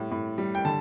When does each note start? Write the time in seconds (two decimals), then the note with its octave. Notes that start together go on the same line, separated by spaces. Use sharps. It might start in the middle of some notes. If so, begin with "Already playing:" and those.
Already playing: A2 G3
0.11 A2
0.38 G3
0.55 G5
0.65 D3 A5